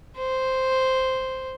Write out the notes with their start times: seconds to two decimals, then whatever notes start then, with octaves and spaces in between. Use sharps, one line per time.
0.18 C5